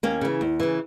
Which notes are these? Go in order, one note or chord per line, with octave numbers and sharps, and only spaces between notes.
D#2 A#3 C#4
C#3 E3
D#2
C#3 E3